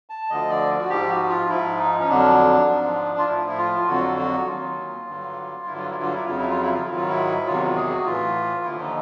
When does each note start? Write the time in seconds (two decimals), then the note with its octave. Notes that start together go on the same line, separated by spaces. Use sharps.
0.10 A5
0.30 D2 D3 F3 D#5
0.50 D5
0.78 F#4
0.90 G#2 F3 G4
1.09 F#4
1.29 F4
1.49 G#2 F3 E4
1.79 D#4
1.99 C#4
2.08 F2 D3 F#3 D4
2.68 G#2 F3
3.18 F4
3.28 A2 F3 E4
3.48 E4
3.58 F4
3.87 F2 D3 F#3 F#4
4.17 F#4
4.47 D#2 D#3 F#3 F4
5.07 G2 D3 F#3
5.67 G2 D3 F#3 E4
5.78 F4
5.91 E4
6.02 F4
6.14 E4
6.25 F2 C#3 F#3 F4
6.38 E4
6.50 F4
6.62 E4
6.73 F4
6.84 G#2 D#3 F#3 E4
6.97 F4
7.08 E4
7.46 E2 C3 D#3 F#3 F4
7.76 G#4
7.91 F#4
8.05 A2 E3 F4
8.65 D#2 D3 F3 E4
8.80 D#4